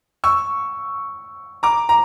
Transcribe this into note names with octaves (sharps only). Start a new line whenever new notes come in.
C#6 E6
A#5 D6
A#5